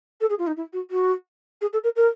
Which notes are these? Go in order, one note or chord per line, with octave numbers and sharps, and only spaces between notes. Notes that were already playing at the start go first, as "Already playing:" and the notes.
A4
G#4
F4
D#4
E4
F#4
F#4
G#4
A4
A#4
A#4